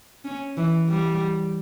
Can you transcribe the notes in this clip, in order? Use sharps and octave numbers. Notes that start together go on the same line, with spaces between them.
C#4
E3
G3